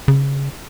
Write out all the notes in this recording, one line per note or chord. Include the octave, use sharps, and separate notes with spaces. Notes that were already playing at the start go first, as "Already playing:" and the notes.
C#3